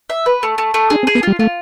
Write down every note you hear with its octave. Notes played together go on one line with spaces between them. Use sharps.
E5
B4
A3
A3
A3
D4 G#4
C4
G#4
B3
G3 F4
A3 F4